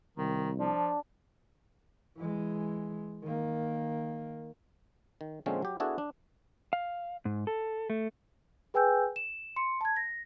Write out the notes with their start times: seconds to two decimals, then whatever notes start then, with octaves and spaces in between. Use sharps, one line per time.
0.18 C2 D#3
0.59 F3 D4
2.18 E3 G#3
3.24 D#3 A#3
5.21 D#3
5.46 A#2 D3 F3 G#3 C4 C#4
5.62 F#3 G4
5.80 B3 D4 E4 F#4 G#4 A4
5.98 D4
6.73 F5
7.25 G#2
7.47 A4
7.90 A3
8.74 G#4 B4 G5 G#5 E6 G6
9.16 E7
9.56 C6 C#7
9.81 A5 G#6
9.96 A#6